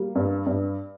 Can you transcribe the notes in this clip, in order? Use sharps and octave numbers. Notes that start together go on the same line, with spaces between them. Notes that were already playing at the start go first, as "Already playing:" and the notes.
Already playing: G3 A#3
G2
G2